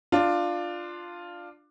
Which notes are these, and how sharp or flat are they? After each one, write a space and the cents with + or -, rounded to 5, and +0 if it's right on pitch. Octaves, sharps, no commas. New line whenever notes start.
D4 +15 F4 +0